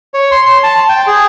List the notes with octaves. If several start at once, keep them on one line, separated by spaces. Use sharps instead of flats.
C#5
C6
C6
A5
G5
G#4